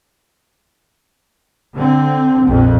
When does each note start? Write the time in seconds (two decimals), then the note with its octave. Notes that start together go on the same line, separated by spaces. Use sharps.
1.76 D3 C4
2.46 A#1 F2